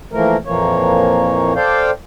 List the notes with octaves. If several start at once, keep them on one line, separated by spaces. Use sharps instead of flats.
E3 F3 A3 A#3 A#4
F2 A#2 E3 F3 A#3 C#5
A4 C5 D5 F5 G5